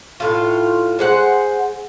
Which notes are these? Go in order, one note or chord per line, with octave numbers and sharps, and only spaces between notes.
A2 F4
G#3 C5 F#5